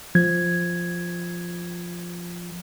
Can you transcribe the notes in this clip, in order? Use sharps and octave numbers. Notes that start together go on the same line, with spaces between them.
F3 G#6